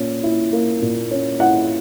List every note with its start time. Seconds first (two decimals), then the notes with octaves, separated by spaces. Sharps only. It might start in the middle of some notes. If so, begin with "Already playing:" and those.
Already playing: A#2 C#4
0.23 E4
0.53 A#3
0.82 A#2
1.11 C#4
1.40 E4 F#5